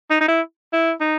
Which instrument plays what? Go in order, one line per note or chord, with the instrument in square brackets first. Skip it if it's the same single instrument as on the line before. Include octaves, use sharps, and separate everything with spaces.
[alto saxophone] D#4
D#4
E4
E4
D#4